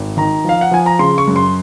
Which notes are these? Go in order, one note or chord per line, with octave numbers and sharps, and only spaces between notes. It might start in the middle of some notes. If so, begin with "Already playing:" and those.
Already playing: G#1
D#3 A#5
F3 F5
F#5
F3 G#5
A#5
C#3 C6
C#6
F#2
C6